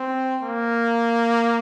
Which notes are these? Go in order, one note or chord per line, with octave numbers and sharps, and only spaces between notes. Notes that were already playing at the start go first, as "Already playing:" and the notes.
Already playing: C4
A#3